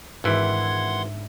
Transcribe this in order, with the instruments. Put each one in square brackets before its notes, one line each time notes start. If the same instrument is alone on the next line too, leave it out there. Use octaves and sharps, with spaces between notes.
[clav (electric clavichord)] G#1 E3 [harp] G#2 D4 E5 [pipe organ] F#5 C6 G#6